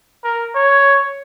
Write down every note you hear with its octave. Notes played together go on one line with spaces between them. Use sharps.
A#4
C#5